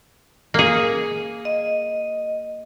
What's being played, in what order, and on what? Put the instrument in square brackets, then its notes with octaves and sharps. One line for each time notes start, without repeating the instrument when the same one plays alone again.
[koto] A#3 G#4
[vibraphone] D#5